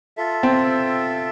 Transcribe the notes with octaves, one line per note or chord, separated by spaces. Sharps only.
F4 A4 E5
C4